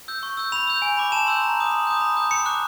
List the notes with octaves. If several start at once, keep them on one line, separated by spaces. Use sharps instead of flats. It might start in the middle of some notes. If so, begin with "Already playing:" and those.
E6 G6
C#6
E6 G6
B5 F7
E6 G6
G#5
B5 D6
A5 E7
C6 E6 G6
A#5
D#6 G6
C6
D#6 G6
B5
D#6 G6
B5 C#7
D6 F#6